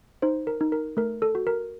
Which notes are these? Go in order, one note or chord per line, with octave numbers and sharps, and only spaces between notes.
D#4 C5
A#4
D#4
A#4
A3 A#4
A4
F#4
A#4